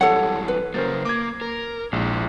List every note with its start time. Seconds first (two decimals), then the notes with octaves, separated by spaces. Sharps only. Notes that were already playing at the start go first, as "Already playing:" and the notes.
0.01 F#2 E3 G3 A4 C#5 F#5
0.48 B4
0.74 C#3 F#3 A#3 A#4 C5 A6
1.05 A#3 D6 G#6
1.41 A#4
1.93 A#1 G#2 G#3 E4